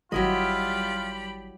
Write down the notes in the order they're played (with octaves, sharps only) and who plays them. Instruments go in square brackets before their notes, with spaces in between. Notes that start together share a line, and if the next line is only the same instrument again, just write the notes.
[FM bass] G#1 [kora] F#3 E4 D#5 [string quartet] G3 G4 B5 [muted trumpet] F4